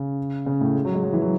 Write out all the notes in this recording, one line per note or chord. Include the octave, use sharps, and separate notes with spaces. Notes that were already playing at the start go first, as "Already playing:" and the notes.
Already playing: C#3
C#3
A2
G#3
F#3
G#3
F#3
E3
F#3